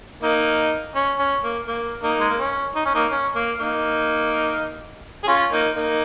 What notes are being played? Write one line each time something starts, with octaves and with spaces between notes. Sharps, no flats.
A#3 D#4
C#4
C#4
A#3
A#3
A#3 D#4
G#3
A#3
C#4
D#4
C#4
A#3 D#4
C#4
A#3
A#3 D#4
G#4
C#4 F4
A#3 D#4
A#3 D#4